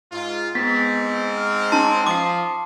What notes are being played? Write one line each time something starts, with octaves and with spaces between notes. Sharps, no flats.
G#2 F4
G#2 B3 C4 A6 B6
F6
C#4 D#4 A5 C6
F3 D6 D#6 C7